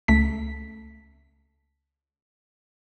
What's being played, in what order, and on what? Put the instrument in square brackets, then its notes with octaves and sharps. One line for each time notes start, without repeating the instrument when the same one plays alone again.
[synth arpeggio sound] C#2 A3 B6